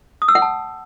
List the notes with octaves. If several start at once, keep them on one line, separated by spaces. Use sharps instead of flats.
D#6
E6
F#5
A5